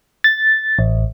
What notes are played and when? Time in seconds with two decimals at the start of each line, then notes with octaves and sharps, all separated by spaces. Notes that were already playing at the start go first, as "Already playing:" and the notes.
0.24 A6
0.79 A1